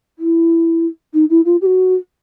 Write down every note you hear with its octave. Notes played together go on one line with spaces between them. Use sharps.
E4
D#4
E4
F4
G4
F#4